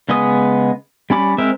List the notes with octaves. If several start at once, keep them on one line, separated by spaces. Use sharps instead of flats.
C#3 G#3 B3 D#5 D#6
G3 C#4 B5 D6
G#3 C4 A#4 E5